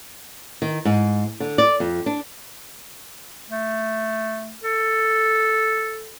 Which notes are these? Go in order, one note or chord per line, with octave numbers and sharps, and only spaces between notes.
D#3
G#2
D3
D5
F2
D4
A3
A4